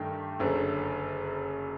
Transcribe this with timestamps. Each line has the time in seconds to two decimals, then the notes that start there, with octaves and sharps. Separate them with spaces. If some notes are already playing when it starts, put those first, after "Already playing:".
Already playing: G2 D#3 A3 G4
0.39 F#1 F#2 D3